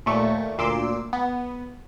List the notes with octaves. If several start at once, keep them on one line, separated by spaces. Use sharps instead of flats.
D#2 A#2 A3 C#6
D2 A#2 C6 D6 E6
B3